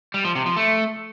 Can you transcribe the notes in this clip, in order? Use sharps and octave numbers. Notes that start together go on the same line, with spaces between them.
G3
F3
C3
F3
A3